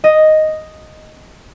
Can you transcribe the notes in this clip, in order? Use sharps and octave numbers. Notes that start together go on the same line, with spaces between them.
D#5